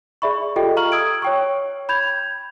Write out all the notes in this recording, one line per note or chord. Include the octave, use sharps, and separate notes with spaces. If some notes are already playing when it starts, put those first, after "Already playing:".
G#4 D5 E5 B5 C#6
F4 G4 A4 D#5 G5
F5 A#5 C#6 F6 F#7
D#6 E6 G#6 D7
C#5 G5 C#6
B5 G6 G#6 F7